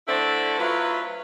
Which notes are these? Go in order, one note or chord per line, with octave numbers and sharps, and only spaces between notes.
D3 A3 E4 C5 D5
F#3 A3 E4 F4 B4